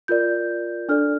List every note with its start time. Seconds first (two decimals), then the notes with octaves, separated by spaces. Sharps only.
0.08 F4 A#4 D5 G6
0.89 D4 A4 D5 F6